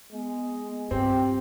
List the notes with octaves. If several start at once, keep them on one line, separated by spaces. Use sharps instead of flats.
G#3 B3
G2 C4 F4 G4